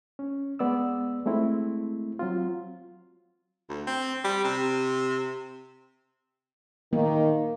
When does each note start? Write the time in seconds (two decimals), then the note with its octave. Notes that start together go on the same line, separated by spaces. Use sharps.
0.19 C#4
0.59 G#3 B3 D5 E6
1.26 G#3 A3 C4 E4
2.19 F#3 C4 F4
3.69 D2
3.87 C4
4.25 G3
4.45 C3
6.93 D#3 A#3